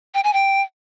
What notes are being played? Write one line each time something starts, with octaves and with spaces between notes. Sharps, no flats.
G5
G#5
G5